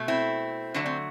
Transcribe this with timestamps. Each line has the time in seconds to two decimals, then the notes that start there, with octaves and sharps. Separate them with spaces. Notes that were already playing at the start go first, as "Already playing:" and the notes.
Already playing: B2 A3
0.08 C4 E4
0.74 D3 F#3 A3 D4
0.86 C4